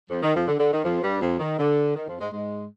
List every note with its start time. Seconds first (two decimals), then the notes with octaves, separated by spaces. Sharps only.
0.10 F2 F3
0.23 D#3
0.34 F2 F3
0.48 D3
0.59 D3
0.72 D#3
0.84 F2 F3
1.02 G2 G3
1.21 F2 F3
1.39 D#3
1.59 D3
1.96 D#3
2.08 F2 F3
2.19 G#2 G#3
2.32 G#2 G#3